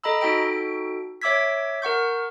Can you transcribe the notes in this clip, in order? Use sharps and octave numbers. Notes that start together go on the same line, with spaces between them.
A4 D#5 A#5 B5 E6
D#4 F#4 A4 G5 D7
C#5 E5 D6 E6 G#6 B6
A#4 F#5 C#6 G6